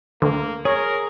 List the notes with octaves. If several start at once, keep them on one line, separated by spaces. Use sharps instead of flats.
D2 A#3
G#4 A#4 C#5